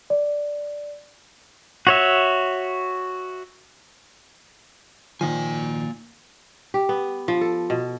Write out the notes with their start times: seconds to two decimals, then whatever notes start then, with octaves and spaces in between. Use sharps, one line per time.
0.10 D5
1.87 F#4 C#5 E5
5.21 A#2 D#3 F3 A#3 G#5
6.74 G4
6.89 B3
7.28 F3
7.41 A4
7.70 B2